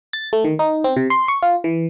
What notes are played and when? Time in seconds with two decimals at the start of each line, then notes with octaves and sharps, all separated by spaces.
0.13 A6
0.33 A3
0.44 D#3
0.59 D#4
0.84 C4
0.97 C3
1.10 C6
1.28 C#6
1.43 F4
1.64 E3